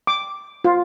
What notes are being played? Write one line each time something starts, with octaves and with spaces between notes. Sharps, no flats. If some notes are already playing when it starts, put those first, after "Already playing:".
D6
F4